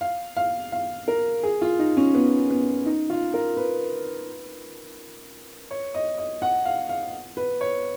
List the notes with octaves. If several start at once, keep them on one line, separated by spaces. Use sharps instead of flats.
F5
F5
F5
A#4
G#4
F4
D#4
C#4
B3
B3
D#4
F4
A#4
B4
C#5
D#5
D#5
F#5
F5
F5
B4
C#5